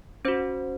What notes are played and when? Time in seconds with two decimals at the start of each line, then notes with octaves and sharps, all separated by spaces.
0.25 C#4 F#4 C5